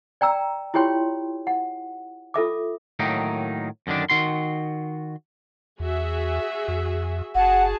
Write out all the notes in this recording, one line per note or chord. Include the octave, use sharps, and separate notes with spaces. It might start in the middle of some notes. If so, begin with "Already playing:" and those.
D5 G5 A#5 E6
E4 F4 G4 C#5 G5 C6
F#5
F4 A4 E5 D6
A2 D#3 F#3 A#3 D#4
F#2 D3 D#3 D4
D#3 F#4 C6
E2 F#4 G#4 E5
F2
F#1 F#4 G#4 F#5 A5